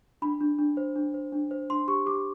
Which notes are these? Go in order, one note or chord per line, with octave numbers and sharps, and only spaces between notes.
D4 B5
D4
D4
C5
D4
C5
D4
C5
D4 C6
G4 C#6
G4 D6